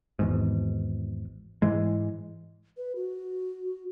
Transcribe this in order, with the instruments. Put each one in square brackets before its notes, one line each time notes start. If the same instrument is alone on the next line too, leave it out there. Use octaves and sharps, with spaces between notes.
[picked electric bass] G#1 E2 G#2
G#2 E3 G#3
[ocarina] B4
F#4